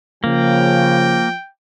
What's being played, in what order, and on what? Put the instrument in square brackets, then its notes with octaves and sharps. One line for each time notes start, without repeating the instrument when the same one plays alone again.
[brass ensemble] C#3 [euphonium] F3 [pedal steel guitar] A#3 [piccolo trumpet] G5